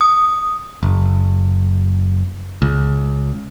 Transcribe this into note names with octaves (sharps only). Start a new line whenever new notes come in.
D#6
F#1
C#2